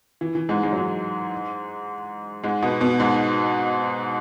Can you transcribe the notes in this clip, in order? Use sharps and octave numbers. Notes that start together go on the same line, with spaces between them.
E3
E3
G#2 G#3
G#2 G#3
F#3
G#2 G#3
G#2 G#3
B2 B3
B2 B3
G#2 G#3